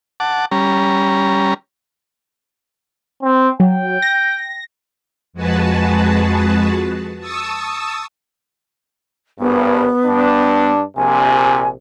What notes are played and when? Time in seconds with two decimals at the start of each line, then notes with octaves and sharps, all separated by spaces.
0.20 F#5 A5 D6
0.51 G3 C#4 A#5
3.23 C4
3.60 F#3 G5
4.02 A#6
5.33 F2 G#3 F#4 G#4 B4 A5
7.19 A5 C#6 D#6 E6
9.39 G#1 G2 B3
10.06 G2 D4
10.97 A#1 C3 G#5